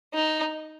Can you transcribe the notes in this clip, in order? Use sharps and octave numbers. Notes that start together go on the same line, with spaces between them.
D#4